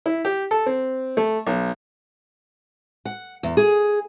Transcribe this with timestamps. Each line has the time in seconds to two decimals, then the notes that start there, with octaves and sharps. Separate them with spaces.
0.06 E4
0.25 G4
0.51 A4
0.66 C4
1.17 A3
1.47 B1
3.05 F#5
3.43 E2
3.57 G#4